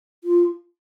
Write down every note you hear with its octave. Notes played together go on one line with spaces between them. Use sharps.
F4